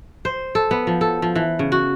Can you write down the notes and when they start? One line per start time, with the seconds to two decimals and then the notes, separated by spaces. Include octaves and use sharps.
0.25 C5
0.55 A4
0.71 B3
0.87 F3
1.01 A4
1.22 F3
1.35 E3
1.59 C#3
1.72 F#4